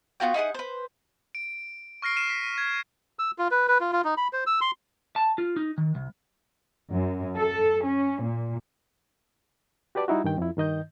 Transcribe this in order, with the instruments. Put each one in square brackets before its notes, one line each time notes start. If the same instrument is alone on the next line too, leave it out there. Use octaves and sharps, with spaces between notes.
[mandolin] B3 F4 F#4 G5
D#4 E4 G#4 F#5
B4 C5
[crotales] D7
C#6 F6 A#6 C7 D7
F6 C7 D#7 E7
B6
G#6
[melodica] E6
F4
B4
B4
F4
F4
D#4
B5
C5
E6
C6
[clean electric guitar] A5
F4
D#4
D#3
C2
[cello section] F#2
A4
C#4
A#2
[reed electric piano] F#4 G4 B4 D5 A5 D6
G3 D#4 E4 F#4
G2 D#3 G5
F2 E4
G2 D#3 D#5 G6